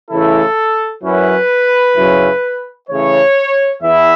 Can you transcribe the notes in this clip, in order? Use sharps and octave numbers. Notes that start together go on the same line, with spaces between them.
C#3 E3 A3 E4 A4
F#2 F#3 C#4 E4 B4
F#2 C#3 F#3 C#4 E4
C#3 E3 A3 C#5
E2 E3 B3 E4 E5